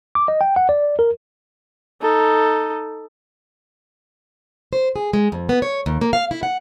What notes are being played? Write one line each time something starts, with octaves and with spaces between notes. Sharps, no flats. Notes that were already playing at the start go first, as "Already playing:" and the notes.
D6
D#5
G5
F#5
D5
A#4
D#4 A4
C5
G#4
G#3
F2
B3
C#5
D#2
A#3
F5
E4
F#5